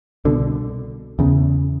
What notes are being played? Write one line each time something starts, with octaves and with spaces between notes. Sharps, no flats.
C2 B2 D3
E2 C#3